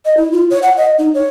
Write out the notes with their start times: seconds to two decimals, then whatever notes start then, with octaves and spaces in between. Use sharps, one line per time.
0.05 D#5
0.17 E4
0.32 F4
0.50 C#5
0.63 F#5
0.77 D#5
0.99 D#4
1.15 C#5